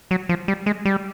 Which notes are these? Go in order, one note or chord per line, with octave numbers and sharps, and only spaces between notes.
F#3
F3
G3
G#3
G3